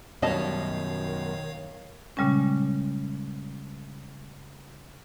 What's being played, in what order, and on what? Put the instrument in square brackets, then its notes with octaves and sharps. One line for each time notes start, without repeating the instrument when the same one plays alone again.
[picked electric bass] F#2 B2 [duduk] D#3 [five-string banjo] G3 D#5 A5 [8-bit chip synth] C#5 F5
[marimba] A#2 C#3 G3 G#3 C#4